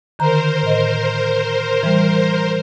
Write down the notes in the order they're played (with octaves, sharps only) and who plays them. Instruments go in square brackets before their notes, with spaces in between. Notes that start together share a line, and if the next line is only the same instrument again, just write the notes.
[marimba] D3 D#3 A#5 [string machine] A#4 C5
[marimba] A2 D#5
E3 G3